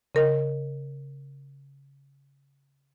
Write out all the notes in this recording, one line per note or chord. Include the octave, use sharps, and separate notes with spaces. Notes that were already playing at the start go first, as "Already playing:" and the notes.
C#3 A#4 D#5